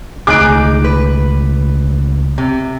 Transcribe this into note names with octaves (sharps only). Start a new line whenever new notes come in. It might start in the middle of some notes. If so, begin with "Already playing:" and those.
C#2 C#3 A3 D#4 G#4 D6 F#6 D7
B4
C3